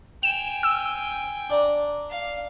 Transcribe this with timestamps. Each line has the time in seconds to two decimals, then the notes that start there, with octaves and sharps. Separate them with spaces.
0.23 G5 G#5 E7
0.63 E6
1.50 D4 D5 A#5
2.10 F5